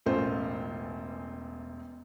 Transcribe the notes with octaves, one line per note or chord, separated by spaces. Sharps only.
E1 A1 E2 A3 F4 C5